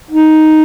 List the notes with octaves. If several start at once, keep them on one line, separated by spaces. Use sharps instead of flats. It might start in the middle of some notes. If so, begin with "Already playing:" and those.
D#4